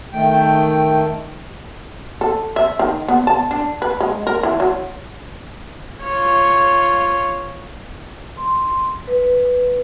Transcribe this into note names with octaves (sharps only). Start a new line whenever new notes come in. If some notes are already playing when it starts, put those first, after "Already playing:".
D#3 A3 G5
A4
E5
D#3
B3
A5
D4
B4
G#3
A#4
E3
F#3
F4 C#5
C6
B4